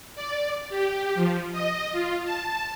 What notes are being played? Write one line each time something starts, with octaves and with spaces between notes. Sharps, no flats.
D5
G4
F3
D#5
F4
A5